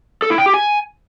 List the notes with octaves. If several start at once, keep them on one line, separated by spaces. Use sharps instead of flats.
A4
E4
G5
G4
G#5